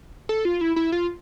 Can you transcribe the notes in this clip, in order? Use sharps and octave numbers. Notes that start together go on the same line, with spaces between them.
A4
F4
E4
E4
F4